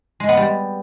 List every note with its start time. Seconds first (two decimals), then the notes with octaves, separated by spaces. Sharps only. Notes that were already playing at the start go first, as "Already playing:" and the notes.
0.20 G#3
0.29 B3
0.37 G3